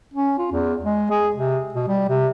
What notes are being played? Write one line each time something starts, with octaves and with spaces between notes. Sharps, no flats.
C#4
F4
E2
G#3
G#4
C3
B2
G3
C3